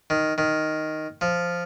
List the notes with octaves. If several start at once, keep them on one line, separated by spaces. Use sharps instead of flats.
D#3
D#3
F3